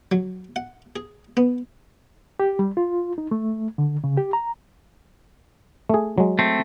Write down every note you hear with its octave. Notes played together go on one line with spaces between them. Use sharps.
F#3
F#5
G#4
B3
G4
G3
F4
D#4
A3
D3
C#3
G4
A#5
A3 G#4
F#3 G#3
A3 C4